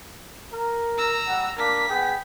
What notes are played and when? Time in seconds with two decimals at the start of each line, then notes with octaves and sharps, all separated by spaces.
0.53 A#4
0.98 A#5 E6
1.28 G3 F#5
1.58 A#3 D4 A#4 B6
1.90 B3 G#4 G5